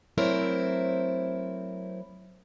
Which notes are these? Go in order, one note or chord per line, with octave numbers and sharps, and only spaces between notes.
F#3 A3 C4 E4 A#4 C5